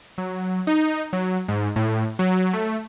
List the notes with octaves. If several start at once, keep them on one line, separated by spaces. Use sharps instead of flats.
F#3
D#4
F#3
G#2
A2
F#3
A3